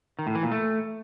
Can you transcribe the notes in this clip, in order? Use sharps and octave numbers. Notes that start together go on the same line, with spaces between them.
D#3
A2
E3
A#2
A3